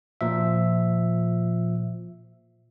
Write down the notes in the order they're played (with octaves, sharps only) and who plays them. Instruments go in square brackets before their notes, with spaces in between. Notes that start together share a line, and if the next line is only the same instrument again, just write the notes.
[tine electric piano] A#2 F3 E5